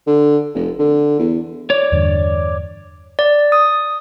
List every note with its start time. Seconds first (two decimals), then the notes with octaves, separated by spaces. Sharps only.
0.07 D3
0.55 F1
0.79 D3
1.19 E2
1.70 C#5 D5
1.92 E2 G2 D3
3.19 D5
3.52 D#6